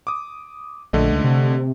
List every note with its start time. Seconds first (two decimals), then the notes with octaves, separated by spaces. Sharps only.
0.07 D6 D#6
0.93 A#1 D3 A3 D#5
1.12 C#2
1.24 C3